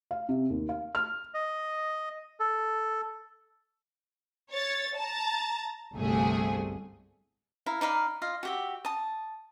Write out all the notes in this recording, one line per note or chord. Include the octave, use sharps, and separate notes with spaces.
F5
C3
D#2
F5
F6
D#5
A4
C#5 A6
A5 A#5 A6
G1 C2 A3 G#4
E4 F5 A#5
D#4 D5 F5 B5
F4 D#5 F5
F#4 G4 E5
A5 D#6